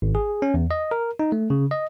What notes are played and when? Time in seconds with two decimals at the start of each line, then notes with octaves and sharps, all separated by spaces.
0.02 G#1
0.15 G#4
0.42 C#4
0.54 E2
0.71 D#5
0.91 A#4
1.19 D#4
1.32 A3
1.50 C#3
1.71 D#5